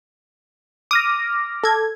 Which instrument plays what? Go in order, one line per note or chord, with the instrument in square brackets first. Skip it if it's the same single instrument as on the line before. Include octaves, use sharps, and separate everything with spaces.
[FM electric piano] D6 F6 A#6 [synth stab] D#6
[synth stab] A4 G#6